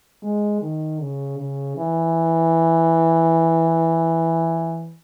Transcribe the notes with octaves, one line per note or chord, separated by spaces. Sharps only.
G#3
D#3
C#3
C#3
E3